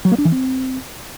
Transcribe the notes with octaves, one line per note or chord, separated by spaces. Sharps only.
F#3
A#3
D4
E3
C4